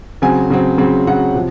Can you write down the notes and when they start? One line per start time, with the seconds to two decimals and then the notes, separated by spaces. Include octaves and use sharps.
0.22 C#3 F#3 C4 G#5
0.50 C#3 F#3 C4
0.78 C#3 F#3 C4
1.07 C#3 F#3 C4 F#5
1.35 C3 F3